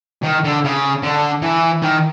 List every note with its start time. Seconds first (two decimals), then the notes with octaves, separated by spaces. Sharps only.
0.24 D#3
0.44 D3
0.64 C#3
1.02 D3
1.42 E3
1.82 D#3